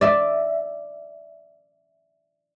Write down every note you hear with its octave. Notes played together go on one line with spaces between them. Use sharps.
D5 E5